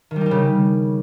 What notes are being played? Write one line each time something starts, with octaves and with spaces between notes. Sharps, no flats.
D#3
G3
D#4
G3
C#3